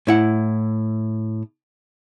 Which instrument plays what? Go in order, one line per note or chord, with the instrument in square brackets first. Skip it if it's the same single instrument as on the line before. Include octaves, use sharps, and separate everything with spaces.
[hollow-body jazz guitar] A2 E4 F#5